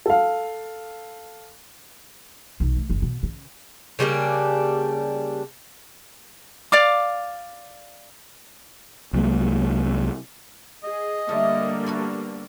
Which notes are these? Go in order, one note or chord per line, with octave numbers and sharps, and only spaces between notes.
A4 F5
B1
A3
F#1
B2
C#3
C#3 G3 A#3 D4
D5 F5 D6
C2 F#3 G#3 A#3
G#4 D#5
D3 G3 A3 A#3
B3 F#4 A4